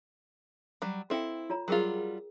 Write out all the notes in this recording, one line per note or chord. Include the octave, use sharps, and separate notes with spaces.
F#3 G3
C4 E4 A4 F5 G5
F4 C#5 A#5
F#3 G3 F4 G#4 A#4 G5